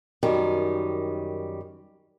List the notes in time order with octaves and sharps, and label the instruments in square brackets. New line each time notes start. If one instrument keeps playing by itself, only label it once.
[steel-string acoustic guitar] F#2 D#3 G3